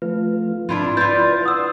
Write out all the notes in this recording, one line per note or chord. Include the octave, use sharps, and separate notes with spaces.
F3 A3 F4 B4
G#2 F3 D4 E4 F4
E4 F4 B4 D5 G6 A6
F#5 C6 D#6 E6